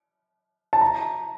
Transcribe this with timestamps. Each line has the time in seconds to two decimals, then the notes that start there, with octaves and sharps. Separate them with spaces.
0.73 A5
0.81 A#5